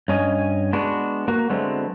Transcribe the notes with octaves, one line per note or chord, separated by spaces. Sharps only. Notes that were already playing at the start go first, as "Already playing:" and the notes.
G2 C#4 D#5 G#5
G#3 B3 D4 F#4
A#3 F#4
D3 F#3 G#3 A3 B3 C4